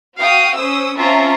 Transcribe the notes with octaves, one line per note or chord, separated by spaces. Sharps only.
F#4 F5 G5 D#6
C#4 C5 D#6 E6
C4 C#4 F4 E5 A5 A#5